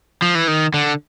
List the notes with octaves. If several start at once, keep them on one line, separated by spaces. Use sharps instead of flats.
F3
E3
D#3
D3